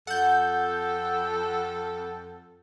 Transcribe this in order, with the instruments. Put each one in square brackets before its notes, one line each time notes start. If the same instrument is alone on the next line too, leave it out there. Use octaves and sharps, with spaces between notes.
[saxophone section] F2 A4 [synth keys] F#5 G6